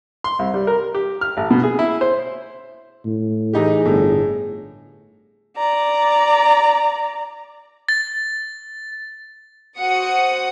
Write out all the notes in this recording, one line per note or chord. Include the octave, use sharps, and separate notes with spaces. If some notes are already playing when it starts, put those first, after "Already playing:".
C6
C2
G3
A#4
G4
F6
A1
B2
G#4
E4
C5
A2
E3 D#4 G4 G#4
G1 A2
D5 A#5
A6
F#4 C5 F#5 D#6 C#7